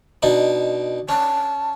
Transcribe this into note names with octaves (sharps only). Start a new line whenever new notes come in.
B2 D4 D#4
C#4 A5